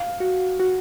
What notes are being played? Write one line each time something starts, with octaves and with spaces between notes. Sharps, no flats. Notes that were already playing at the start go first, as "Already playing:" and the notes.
Already playing: F5
F#4
F#4